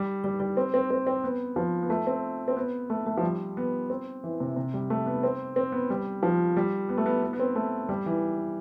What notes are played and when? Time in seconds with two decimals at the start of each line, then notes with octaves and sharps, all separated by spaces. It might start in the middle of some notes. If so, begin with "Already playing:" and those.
Already playing: G3
0.24 G3
0.40 G3
0.57 C4
0.74 C4
0.91 C4
1.07 C4
1.24 B3
1.56 F3
1.83 B3
1.90 A3
2.07 C4
2.48 C4
2.57 B3
2.90 A3
3.06 A3
3.17 F3
3.23 G3
3.57 B3
3.90 C4
4.24 E3
4.40 C3
4.56 C3
4.74 G3
4.90 A3
5.06 B3
5.23 C4
5.56 C4
5.72 B3
5.90 G3
6.23 F3
6.57 G3
6.89 B3
6.98 A3
7.06 B3
7.23 B3
7.33 B3
7.40 C4
7.56 A3
7.89 G3
8.06 E3